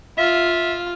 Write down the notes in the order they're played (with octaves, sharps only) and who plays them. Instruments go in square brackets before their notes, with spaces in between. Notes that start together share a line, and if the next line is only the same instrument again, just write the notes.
[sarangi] F4 [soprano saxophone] E5